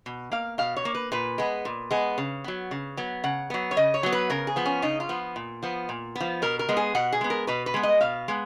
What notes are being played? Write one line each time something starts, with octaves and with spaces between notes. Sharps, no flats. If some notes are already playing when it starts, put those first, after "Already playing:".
B2
A#3 F5
B2 F5
C#5
A#3
B4
A#2 B4
G#3 B3
A#2
G#3 B3
C#3
F#3 B3
C#3
F#3 B3
C#3 F#5
F#3 B3
C#5
C#3 D#5
C#5
F#3 B3
B4
C#3 A#4
G#4
F3 B3
C#4
C#3 D#4
F4
F3 B3
A#2
F3 B3
A#2
F3 B3
B2 A#4
A#4
G#3 B3
G#4
B2 F#5
G#4
G#3 B3
A#4
B2 B4
B4
G#3 B3
D#5
B2 F5
G#3 B3